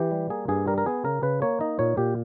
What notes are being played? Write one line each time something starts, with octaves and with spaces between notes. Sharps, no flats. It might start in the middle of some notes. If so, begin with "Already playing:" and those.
Already playing: E3 G4
G3
A#3 G#4
G2 G#4
G3 A#4
A#4
B3 G#4
C#3 A#4
C#3 B4
A#3 C#5
D#4 D#5
A#2 C#5
A#2 G4